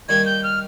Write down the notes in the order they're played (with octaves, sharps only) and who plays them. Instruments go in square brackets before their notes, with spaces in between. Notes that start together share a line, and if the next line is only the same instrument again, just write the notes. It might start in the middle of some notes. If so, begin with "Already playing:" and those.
[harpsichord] D#3 G3 A#3 D#4 [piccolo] G#6
[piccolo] G6
F6